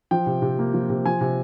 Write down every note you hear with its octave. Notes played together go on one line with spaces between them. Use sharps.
F3 G5
C3
C3
A#3
F3
C3
F3 G#5
C3